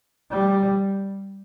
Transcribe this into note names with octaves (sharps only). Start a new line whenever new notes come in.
G3